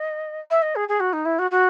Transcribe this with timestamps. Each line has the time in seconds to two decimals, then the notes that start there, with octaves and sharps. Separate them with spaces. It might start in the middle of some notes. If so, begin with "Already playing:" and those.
Already playing: D#5
0.51 E5
0.62 D#5
0.76 G#4
0.89 G#4
1.00 F#4
1.13 D#4
1.25 E4
1.39 F#4
1.51 F#4